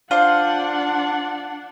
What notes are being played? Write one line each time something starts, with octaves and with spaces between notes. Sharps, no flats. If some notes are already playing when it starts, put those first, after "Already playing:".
D4 F4 C5 D5 F#5